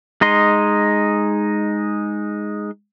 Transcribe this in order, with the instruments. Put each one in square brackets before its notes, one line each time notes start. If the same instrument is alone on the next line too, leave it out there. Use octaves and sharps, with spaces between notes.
[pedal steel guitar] G#3 D#4 D#5 C6